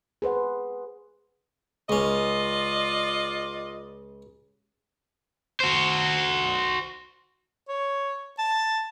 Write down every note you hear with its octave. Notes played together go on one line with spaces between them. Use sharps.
G#4 B4 C5 F#5
C#2 C#4 F4 D5 D#5
F#4 C5
C#5
A5